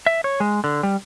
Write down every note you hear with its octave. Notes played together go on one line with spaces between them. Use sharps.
E5
C#5
G#3
D3
G3